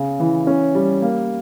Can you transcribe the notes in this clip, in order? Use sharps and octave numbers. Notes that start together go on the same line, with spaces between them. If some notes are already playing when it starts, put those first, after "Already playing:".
Already playing: C#3
E3
C#4
G3
A#3